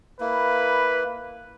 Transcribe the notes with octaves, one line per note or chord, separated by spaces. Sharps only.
A#3 E4 B4